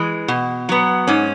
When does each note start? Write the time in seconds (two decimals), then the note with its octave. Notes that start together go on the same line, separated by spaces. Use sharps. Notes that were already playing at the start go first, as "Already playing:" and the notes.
Already playing: E3 G#3
0.28 B2
0.69 F#3 B3
1.07 G#2 C#4